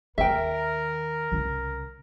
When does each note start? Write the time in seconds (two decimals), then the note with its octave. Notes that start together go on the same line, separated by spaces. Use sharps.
0.18 D#2 D#3 A#4 E5 G5
1.32 C2 C#3